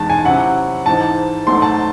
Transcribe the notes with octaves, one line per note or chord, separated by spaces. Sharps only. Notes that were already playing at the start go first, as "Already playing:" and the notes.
Already playing: E2 D#3 G#3 A5
G#5
C3 F#3 C#4 E4 F#5
G#2 E3 C4 D#4 A5
G#2 D#3 F#3 A3 C6
A5